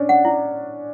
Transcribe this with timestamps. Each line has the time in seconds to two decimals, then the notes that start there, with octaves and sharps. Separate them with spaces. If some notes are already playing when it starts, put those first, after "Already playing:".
Already playing: C#4 D4
0.09 F#5
0.25 E4